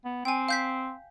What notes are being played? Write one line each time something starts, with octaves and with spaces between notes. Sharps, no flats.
B3
C4 G5 G#5
F5 G6 B6